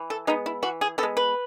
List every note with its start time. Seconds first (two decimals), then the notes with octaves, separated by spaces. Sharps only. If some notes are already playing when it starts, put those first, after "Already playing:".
Already playing: E3
0.10 A4
0.27 G#3 B3 D#4
0.46 E4
0.62 E3 F#4
0.81 G#4
0.98 B3 A4
1.03 G#3
1.17 B4